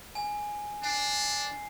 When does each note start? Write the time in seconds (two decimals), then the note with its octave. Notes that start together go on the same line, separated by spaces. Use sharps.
0.15 G#5
0.83 D4 G#5 C7